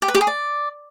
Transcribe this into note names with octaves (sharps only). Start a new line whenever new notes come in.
G4
B4
G4
G#4
D5